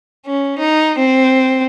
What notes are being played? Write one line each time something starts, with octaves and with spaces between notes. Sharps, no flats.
C#4
D#4
C4